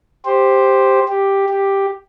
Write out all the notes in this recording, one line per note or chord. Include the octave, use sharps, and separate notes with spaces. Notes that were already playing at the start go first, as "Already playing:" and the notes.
G4 C5
G4
G4